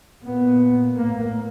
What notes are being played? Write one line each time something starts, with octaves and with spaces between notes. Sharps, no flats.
A#2 B3
A2 A#3